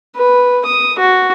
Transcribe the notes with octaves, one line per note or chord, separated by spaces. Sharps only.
B4
D#6
F#4